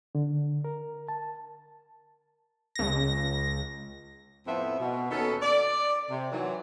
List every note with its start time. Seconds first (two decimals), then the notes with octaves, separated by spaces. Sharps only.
0.15 D3
0.64 A#4
1.08 A5
2.75 C#2 A#6
4.47 F2 A2 F3 B3 C4 E5
4.79 B2
5.11 D#2 B3 C#4 D#4 A4
5.42 D5
6.10 C3
6.33 D#3 E3 F#3